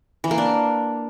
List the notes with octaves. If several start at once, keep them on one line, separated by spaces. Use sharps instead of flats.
E3
A#3
D4